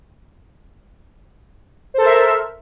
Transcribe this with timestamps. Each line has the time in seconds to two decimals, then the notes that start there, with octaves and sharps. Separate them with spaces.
1.94 C5
1.98 A4
2.02 A#4
2.06 E5